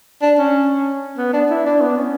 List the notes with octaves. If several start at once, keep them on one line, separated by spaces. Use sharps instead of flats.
D4
C#4
B3
D4
E4
D4
B3
C#4